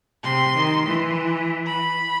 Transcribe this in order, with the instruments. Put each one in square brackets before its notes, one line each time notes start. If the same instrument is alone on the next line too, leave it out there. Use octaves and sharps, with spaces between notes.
[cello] C3 [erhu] C6
[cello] D#3
E3
[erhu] B5